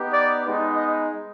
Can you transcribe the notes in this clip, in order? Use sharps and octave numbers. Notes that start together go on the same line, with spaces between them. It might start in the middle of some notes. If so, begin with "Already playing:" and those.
Already playing: B3 D#4 G4
D5
G#3 B3 D#4
D#5